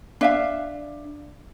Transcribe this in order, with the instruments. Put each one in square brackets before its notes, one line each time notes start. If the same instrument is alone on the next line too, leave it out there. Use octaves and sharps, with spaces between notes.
[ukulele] D4 E5 F5